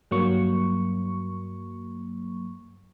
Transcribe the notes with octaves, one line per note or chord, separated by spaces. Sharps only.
G2 F#3 A#3 C#6